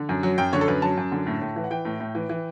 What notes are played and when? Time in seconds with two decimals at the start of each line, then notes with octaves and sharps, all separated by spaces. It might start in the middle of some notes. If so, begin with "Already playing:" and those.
Already playing: D3
0.09 F#2
0.23 F#3
0.38 F#2 G5
0.53 D3 C#5
0.61 A4
0.68 F#2 B4
0.82 F#3 A5
0.97 F#2
1.12 D3
1.26 A2
1.42 A2
1.56 E3
1.64 F#5
1.71 E3 G5
1.85 A2
2.00 A2
2.15 E3
2.29 E3